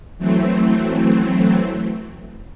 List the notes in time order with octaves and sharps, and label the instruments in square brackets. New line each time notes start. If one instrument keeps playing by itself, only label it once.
[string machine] E3 F#3 A3 C4